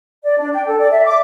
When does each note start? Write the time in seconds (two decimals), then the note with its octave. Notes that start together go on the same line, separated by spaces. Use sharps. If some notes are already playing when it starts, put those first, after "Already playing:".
0.24 D5
0.39 D4
0.53 G5
0.67 A4
0.79 D5
0.91 E5
1.05 D6